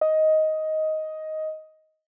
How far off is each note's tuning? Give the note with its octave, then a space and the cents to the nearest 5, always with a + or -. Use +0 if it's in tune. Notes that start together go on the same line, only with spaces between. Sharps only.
D#5 +10